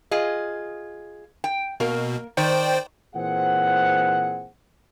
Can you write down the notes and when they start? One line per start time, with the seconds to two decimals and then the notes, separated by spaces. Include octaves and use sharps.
0.11 F4 G#4 D#5
1.44 G5
1.80 B2 A#3 A#4
2.37 D#3 C5 D5 G5
3.15 A#2 E3 C4 G#4 C5 F#5